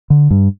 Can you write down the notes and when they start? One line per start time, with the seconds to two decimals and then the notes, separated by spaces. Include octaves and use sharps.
0.10 D3
0.31 G2